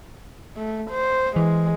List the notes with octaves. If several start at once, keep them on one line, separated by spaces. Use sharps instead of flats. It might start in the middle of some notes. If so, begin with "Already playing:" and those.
A3
C5
E3 G#3